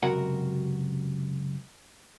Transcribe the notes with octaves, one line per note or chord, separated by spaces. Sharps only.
C#2 F#2 C3 F#4 A#4 F#5